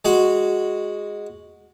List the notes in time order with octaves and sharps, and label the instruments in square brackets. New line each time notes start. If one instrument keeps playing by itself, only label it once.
[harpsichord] G#3 F#4